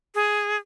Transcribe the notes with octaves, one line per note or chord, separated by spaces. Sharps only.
G#4